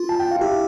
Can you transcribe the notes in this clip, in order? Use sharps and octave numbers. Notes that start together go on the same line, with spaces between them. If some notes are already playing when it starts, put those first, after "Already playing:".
Already playing: F4
A5
G5
F5
E4 G4 E5